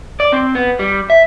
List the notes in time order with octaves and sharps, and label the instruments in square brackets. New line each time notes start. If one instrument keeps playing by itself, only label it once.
[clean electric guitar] D5
C4
B3
G3
E5